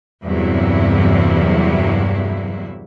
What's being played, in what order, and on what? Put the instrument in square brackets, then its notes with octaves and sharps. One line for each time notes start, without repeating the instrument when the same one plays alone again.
[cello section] E2 G2 C3 F#3 A#3 E4